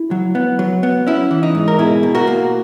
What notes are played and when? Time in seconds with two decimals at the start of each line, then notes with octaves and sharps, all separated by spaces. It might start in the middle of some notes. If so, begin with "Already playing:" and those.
Already playing: E4
0.11 F#3
0.35 B3
0.59 F#3
0.83 B3
1.07 C#4 E4
1.31 E3
1.43 D#4
1.55 G#2
1.68 A#4
1.79 B2 E4 G#4
2.03 B2
2.15 F#4 A#4
2.27 A#3